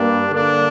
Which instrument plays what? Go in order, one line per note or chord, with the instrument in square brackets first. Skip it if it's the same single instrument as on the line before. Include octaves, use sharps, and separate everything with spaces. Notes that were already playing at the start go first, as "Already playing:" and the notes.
Already playing: [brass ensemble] G2 G3 A#3 D4
D3 A#3 D4